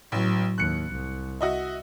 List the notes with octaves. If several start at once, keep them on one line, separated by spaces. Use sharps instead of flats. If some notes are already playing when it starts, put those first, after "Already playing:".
A1 A2 F#3
D#2 F#6 C#7
C2
F#4 D#5 E5